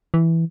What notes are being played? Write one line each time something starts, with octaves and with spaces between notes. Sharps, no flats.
E3